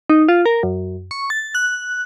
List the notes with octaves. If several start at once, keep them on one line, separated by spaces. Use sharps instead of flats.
D#4
F4
A#4
F#2
C#6
A6
F#6